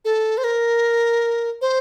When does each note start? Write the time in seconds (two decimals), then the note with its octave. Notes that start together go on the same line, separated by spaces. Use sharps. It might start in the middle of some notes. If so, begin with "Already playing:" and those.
0.05 A4
0.38 C5
0.44 A#4
1.61 C5